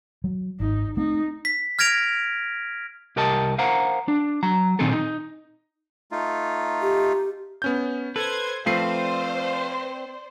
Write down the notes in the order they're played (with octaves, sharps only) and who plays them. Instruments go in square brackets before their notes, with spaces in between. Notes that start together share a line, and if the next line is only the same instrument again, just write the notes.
[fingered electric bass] F#3
[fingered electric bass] G#1 [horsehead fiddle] D#4
[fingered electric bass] A3 C4 [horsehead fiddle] D#4
[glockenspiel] B6
F6 G#6 A#6 D7 F7
[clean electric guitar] C2 G4 A#4 D#5 A5
A#4 C5 F5 F#5 A#5
D4
F#3 A#5
A#2 D#3 C4 D#4 G#4 A4
D#4
[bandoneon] A3 D#4 F4
[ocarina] G4
[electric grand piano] B3 C#4 G6
[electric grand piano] A4 [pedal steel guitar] B4 [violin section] C5 G#6
[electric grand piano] F3 A3 C7 [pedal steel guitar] C4 B4 [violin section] C5 D5 [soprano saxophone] F5